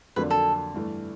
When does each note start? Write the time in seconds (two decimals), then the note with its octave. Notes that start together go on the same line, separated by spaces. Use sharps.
0.16 F2 D3 F#3 A#3 D4 B4
0.30 A4
0.75 G2 E3 A3